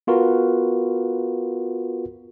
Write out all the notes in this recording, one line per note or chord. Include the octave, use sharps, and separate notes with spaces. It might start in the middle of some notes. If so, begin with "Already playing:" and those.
B3 F4 F#4 A#4 B4